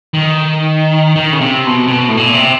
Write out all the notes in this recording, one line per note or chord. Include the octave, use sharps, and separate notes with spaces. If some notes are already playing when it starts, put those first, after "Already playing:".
D#3
D#3
C#3
C3
B2
C3
B2
A2
A#2
C3